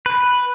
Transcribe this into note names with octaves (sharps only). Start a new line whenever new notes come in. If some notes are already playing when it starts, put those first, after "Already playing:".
B4